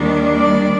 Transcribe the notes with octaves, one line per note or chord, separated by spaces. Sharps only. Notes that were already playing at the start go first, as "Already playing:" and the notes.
Already playing: D#2 D#3 G3 D4
D5